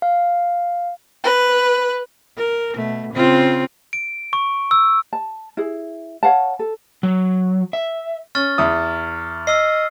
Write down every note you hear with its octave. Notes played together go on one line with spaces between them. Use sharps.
F5
B4
A#4
B2 A3
C#3 C4 F4
D7
C#6
E6
A5
E4 G#4
C#5 F5 F#5 A5
A4
F#3
E5
C#4 C#6 F6 A6
E2 E4 D#6
D#5 E6 F6 C7